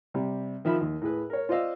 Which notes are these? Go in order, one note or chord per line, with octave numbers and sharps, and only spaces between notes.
C3 G3
D#3 F3 E5 B5
D#2
A2 G#4 B4
A#4 C#5
F4 C5 D5 D#5 F5 E6